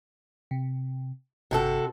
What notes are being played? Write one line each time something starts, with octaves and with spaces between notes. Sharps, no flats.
C3
G1 C3 F#4 A4 A5 E6